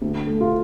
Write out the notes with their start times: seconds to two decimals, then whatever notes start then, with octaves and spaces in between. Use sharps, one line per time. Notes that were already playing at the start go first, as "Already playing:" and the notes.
0.02 D2
0.27 A3
0.41 F4